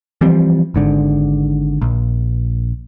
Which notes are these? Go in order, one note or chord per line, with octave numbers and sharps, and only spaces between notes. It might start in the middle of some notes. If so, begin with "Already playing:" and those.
E3 F3 G3 C4
G#1 G#2 D3
A#1